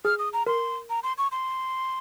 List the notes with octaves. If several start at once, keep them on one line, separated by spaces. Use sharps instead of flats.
G#4 F6
D#6
A#5
A#4 C6
A#5
C6
C#6
C6